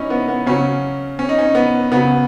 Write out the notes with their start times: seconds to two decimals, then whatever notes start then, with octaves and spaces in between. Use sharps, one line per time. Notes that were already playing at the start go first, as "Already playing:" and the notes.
Already playing: C#4 D#4 E4
0.10 B3
0.28 B3
0.46 C#3 F#3 C#4
1.19 C#4
1.29 D#4
1.39 C#4
1.55 B3
1.92 C#3 F#3 B3